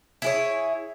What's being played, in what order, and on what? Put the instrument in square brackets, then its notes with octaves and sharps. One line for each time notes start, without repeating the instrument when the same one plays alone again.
[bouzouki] E4 G#4 C#5